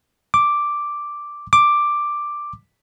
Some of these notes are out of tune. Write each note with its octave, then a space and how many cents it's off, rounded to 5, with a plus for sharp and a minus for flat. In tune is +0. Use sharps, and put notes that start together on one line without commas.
D6 +0
D6 +5